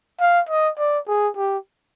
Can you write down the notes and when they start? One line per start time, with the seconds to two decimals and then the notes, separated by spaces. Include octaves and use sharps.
0.20 F5
0.49 D#5
0.78 D5
1.08 G#4
1.37 G4